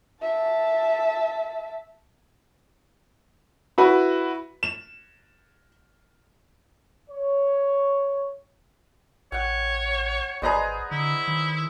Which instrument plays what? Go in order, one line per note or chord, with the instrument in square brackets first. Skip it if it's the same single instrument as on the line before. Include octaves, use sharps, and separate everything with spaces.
[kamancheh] E5 A5
[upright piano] E4 F#4 B4
E7
[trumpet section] C#5
[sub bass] A1 [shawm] C#5 [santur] F#5 G5
[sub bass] G#1 [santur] G#4 B4 C5 [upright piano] D5 D#5 A#5
[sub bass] D3 [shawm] E4
[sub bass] D#3